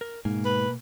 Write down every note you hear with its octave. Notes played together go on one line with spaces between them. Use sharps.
A#4
G#2 B2 A#3 G#5
B4